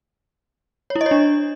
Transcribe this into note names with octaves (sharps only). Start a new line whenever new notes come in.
C#5
E4
D#5
C#5
D4